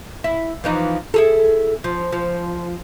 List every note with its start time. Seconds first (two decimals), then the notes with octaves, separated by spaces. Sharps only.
0.24 E4
0.64 E3 F3 D#4
1.14 E4 G#4 A4
1.84 F3
2.12 F3